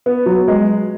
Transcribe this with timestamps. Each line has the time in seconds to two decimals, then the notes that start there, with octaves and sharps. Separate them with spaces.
0.06 B3
0.26 F#3
0.48 G#3